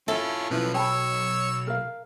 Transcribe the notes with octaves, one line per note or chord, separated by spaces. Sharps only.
C#4 E4 F4 A4 E5
B1 F3 C#4 E4 B4
C#5 G5 A5 B5 E6
A#4 F5